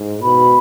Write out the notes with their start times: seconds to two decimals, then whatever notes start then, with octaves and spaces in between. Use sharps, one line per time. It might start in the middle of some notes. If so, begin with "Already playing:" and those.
Already playing: G#2
0.22 B2 B5